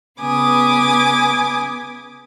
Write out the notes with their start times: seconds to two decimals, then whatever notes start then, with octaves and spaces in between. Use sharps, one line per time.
0.20 C#3 B3 B4 G#5 D6 D#6